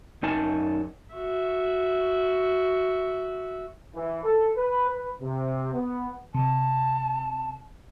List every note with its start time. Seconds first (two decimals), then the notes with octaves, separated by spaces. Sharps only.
0.23 F#2 D#4 G#5 A5
1.15 F#4 E5
3.95 E3
4.24 A4
4.56 B4
4.89 B4
5.22 C3
5.74 B3
6.34 C3 A5